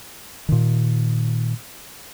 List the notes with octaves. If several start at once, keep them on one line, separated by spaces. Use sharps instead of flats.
A#2 D#3